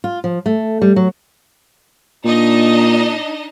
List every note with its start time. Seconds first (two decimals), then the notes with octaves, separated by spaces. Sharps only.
0.04 F4
0.24 F3
0.46 A3
0.82 G3
0.96 F#3
2.24 A#2 D4 D#4 D#5